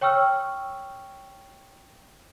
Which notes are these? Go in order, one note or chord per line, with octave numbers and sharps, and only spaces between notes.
C#5 G5 C#6 E6 F6